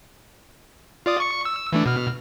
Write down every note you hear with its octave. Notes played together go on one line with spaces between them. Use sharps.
F4 D5 D#6
C#6 C#7
E6
E3 A3 D4
B2 F6